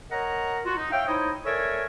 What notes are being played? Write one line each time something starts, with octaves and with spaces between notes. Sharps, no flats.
A#4 C#5 D#5 F#5 A#5
F4 F#4
D#4
C#5 E5 F5 G5
D#4 E4 C5 C#5 D#5
A4 A#4 C#5 D5 E5 G#5